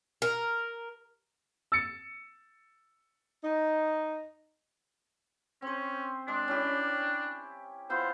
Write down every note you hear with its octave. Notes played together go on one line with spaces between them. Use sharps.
A#4
E6 A6 C#7
D#4
C4 C#4 C5
G#3 D4
C#4 E4 G4
B3 E4 F4 C5